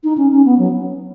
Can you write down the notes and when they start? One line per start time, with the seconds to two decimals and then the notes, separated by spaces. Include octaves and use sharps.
0.04 D#4
0.18 C#4
0.32 C#4
0.45 B3
0.59 F#3